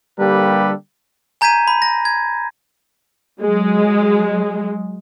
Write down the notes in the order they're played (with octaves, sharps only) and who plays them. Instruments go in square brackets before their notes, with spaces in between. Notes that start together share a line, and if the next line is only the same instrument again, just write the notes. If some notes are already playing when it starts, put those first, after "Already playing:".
[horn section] D3 G3 A#3 G4 A4 B4
[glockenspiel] G#5 A#5 G6 G#6 B6 D#7
B5
A#6
G#6
[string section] F#3 G#3